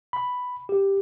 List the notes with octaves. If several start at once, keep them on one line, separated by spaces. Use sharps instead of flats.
B5
G4